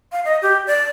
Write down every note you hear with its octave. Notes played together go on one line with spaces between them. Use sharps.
F5
D#5
G4
D5